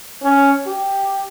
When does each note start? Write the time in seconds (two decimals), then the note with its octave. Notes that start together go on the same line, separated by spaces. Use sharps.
0.23 C#4
0.67 G4